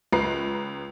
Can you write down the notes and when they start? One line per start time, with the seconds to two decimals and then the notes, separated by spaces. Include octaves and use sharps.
0.13 C#2 B4 A#5 C7